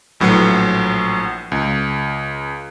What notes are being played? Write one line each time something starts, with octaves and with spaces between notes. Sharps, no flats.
A#1 A2 F#3 B4 C#7
C#2